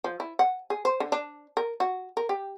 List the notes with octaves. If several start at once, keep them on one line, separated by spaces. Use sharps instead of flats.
F3
E4
F#5
G#4
C5
D3
D4
A#4
F#4
A#4
G4